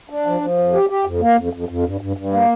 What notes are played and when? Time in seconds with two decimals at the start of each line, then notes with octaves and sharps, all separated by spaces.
0.09 D4
0.26 F3
0.41 F3
0.58 F2
0.73 G4
0.89 G4
1.05 F2
1.21 A#3
1.37 F2
1.53 F2
1.69 F2
1.84 G2
2.01 G2
2.17 G2
2.32 A#3